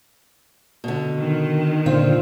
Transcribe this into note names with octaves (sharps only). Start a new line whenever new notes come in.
B2 D3
D#3
A#2 D3 C4 F4